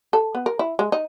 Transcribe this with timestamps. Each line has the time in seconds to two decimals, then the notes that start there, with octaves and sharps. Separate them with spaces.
0.13 A4
0.35 B3
0.46 A#4
0.59 E4
0.79 G#3
0.92 D#4